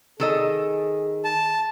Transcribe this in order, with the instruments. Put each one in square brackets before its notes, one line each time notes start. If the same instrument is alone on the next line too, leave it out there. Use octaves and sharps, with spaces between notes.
[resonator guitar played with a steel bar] D#3 A4 D#5 [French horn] G#4
[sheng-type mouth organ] A5